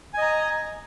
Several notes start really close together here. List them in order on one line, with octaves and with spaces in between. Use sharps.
G#5 D#5 A#5